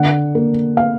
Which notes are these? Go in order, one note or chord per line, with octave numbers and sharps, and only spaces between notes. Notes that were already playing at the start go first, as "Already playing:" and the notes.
Already playing: D3 F#5
A#3
F5